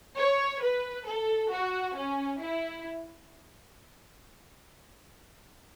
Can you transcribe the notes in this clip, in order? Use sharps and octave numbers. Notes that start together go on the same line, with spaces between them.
C#5
B4
A4
F#4
C#4
E4